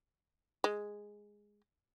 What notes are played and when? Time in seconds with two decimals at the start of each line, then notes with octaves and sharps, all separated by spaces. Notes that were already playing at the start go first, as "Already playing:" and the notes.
0.64 G#3